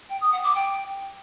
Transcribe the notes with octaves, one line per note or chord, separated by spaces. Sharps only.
G5
D#6
F#5
D6
G5